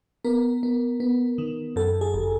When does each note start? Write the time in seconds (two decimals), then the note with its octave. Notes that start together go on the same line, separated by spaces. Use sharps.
0.25 B3 A#4
0.63 B3
1.00 B3
1.38 D#3
1.76 F#2 A4
2.01 G#4
2.14 G1